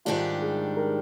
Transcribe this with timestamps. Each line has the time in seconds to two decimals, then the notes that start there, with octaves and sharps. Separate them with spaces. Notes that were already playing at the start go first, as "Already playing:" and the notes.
0.05 G#2 D#3 G3 D4 F4 G4
0.42 G#4
0.77 A#4